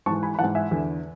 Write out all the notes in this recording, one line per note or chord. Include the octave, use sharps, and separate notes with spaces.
G#2 E3 A5 C#6
G#5 B5
B5
G#2 E3 F#5 A5
E5 G#5
E2 D3